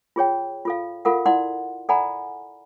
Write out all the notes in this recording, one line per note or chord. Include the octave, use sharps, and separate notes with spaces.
F4 G#4 C#5 G5
F4 A4 F5
F4 A4 A#4 F5 F#5
E4 D5 F#5 C6
A4 D5 F#5 G#5 A#5 B5